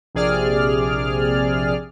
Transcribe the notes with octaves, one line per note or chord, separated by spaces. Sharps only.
A#1 C3 G#4 D5 F6